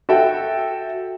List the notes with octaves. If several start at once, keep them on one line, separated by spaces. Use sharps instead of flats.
F#4 A4 E5 G5